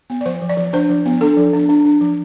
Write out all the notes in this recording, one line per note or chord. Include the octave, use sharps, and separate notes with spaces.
B3
D5
F3 C5
F3
D5
F3
D4 C5
F3
B3
D4 A4
F3
D4
D4
D4
F3